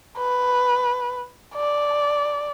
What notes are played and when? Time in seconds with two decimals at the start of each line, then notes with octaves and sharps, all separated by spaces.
0.18 B4
1.55 D5